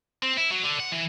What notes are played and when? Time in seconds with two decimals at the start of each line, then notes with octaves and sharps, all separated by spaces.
0.23 C4
0.37 E4
0.51 F#3
0.64 D3
0.80 F#5
0.92 E3